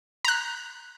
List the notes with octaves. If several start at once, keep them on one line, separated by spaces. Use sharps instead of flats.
A#5 F#6